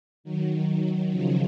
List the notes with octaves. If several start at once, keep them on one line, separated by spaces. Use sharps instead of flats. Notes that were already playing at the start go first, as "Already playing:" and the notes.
D#3 F#3
C#3 F3